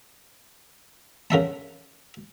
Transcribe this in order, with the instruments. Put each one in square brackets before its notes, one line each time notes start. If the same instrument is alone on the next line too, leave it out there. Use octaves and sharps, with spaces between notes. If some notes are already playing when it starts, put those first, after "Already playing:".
[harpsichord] C#3 A#4 E5 A5